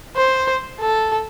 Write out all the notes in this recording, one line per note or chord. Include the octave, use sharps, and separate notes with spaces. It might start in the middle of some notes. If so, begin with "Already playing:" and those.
C5
A4